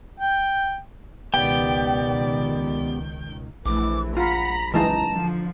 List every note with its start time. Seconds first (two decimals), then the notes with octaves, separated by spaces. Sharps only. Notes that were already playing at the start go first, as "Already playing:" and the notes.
0.20 G5
1.34 C#2 B2 D#3 B3 G4 D5 G5
3.66 A#1 E3 A3 D6
4.17 F4 F#5 A#5 B5 B6
4.74 C#2 F#2 E3 G#3 D#4 A5 A#5
5.11 D3 F3